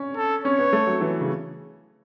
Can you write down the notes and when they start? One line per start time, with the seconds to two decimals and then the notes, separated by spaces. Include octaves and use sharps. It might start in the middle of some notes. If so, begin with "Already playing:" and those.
Already playing: C#4
0.17 A4
0.45 C#4 C#5
0.59 B3
0.73 A3
0.87 F#3
1.01 E3
1.21 C#3